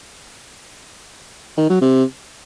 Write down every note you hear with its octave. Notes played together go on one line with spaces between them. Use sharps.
D#3
F#3
C3